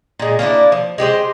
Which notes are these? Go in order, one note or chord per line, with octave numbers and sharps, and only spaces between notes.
A#2 G#3
A#3 C#4 D4 E4
F3
G#3 G4 B4 C5